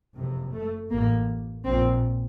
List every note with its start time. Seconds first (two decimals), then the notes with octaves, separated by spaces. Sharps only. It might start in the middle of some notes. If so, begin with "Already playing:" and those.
0.15 F#1 F2 C3
0.52 A3
0.91 A1 A2 A#3
1.64 A#1 A#2 C4